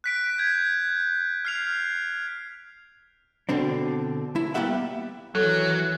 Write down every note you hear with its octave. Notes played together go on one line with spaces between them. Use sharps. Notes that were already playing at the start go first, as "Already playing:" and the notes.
F#6 B6 D7
G6 G#6
F6 C7 F7
B2 D3 C4 D4
E4
G3 A#3 B3 G4 E5 F#5
D#3 E3 F#3 A4 F#6